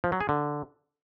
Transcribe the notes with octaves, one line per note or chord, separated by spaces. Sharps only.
F3
F#3
G#4
D3